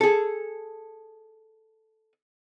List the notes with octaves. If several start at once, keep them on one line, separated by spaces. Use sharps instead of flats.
G#4 A4